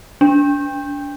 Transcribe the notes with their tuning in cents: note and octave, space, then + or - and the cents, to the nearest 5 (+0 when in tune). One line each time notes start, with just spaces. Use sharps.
D4 -30